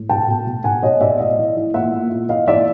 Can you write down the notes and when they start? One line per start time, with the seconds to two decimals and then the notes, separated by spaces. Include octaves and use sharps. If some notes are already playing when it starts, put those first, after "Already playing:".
Already playing: A2
0.09 B2 G5 A5
0.28 B2
0.47 B2
0.64 B2 F#5 G#5
0.83 B2 C#5 D#5
1.01 B2 D5 E5
1.20 A2 D#5 F5
1.38 E3
1.57 E3
1.74 A#2 E5 F#5
1.93 A#2
2.11 A#2
2.29 E3 D#5 F5
2.47 E3 D5 E5